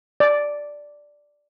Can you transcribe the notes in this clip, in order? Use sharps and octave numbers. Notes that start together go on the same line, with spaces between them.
D5